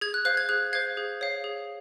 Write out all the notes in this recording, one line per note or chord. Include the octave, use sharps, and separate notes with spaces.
G#4 G#6
F#6
C5 F5 F#6
G#6
G#4 F#6
C5 F5 G#6
G#4
C#5 F5
G#4